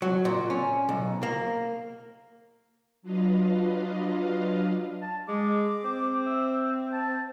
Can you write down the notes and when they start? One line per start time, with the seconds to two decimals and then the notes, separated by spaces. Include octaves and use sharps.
0.02 F#3
0.25 A#2
0.50 C#4
0.89 B1
1.23 A#3
3.02 F#3 D4 F4 B4 D#5 F5
5.02 A5
5.28 G#3 D6
5.84 C4
6.26 E5
6.93 A5